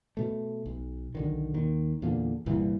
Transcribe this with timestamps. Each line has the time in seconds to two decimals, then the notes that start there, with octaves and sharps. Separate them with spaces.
0.17 B2 A3
0.66 B1
1.15 B1 D3 D#3
1.54 D#2 D#3
2.02 E2 A#2 D3
2.46 C2 G2 A#2 E3